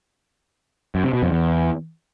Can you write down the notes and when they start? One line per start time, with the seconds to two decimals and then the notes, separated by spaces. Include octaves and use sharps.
0.95 F#2
1.04 C3
1.13 B2
1.23 F2
1.32 E2